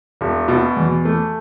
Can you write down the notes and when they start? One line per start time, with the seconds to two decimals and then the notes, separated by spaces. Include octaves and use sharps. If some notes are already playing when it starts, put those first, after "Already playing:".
0.21 E1
0.48 B2
0.77 E2
1.05 A3